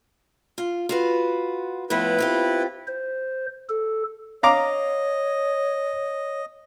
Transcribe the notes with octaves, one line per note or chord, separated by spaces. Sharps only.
F4
F4 F#4 B4
A2 F3 B3 E4 B4
C4 F4 G4
C5
A4
C#5 D#5 F5 A#5 D6